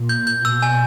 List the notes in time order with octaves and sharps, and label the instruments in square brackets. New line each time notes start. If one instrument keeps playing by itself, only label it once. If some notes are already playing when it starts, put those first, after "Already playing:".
Already playing: [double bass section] A#2
[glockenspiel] G6
G6
[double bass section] B2 [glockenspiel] E6
[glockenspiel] G#5